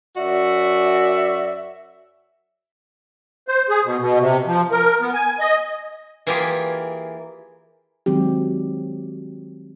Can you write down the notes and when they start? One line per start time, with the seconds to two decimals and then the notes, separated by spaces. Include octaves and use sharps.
0.17 F#2 F#4 D5 E5
3.48 C5
3.69 G#4
3.85 B2
4.00 B2
4.20 C3
4.47 F3
4.72 A#4
5.01 B3
5.14 G#5
5.40 D#5
6.27 E3 A#3 E4 F4 G4 G#4
8.06 D#3 F#3 G#3 C4 G4